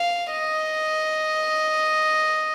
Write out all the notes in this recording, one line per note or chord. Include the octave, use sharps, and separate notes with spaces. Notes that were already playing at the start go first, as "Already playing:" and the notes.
Already playing: F5
D#5